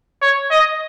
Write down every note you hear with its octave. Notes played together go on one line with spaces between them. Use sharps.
C#5
D#5